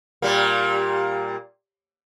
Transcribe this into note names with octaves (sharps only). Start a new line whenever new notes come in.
A#2 G3 A#3